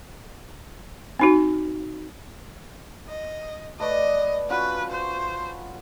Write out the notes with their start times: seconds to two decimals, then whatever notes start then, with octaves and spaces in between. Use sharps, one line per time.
1.19 C4 D#4 F#4
3.08 D#5
3.80 A3 B4 D5 D#5
4.50 C#4 F4 F#4 B4
4.90 C5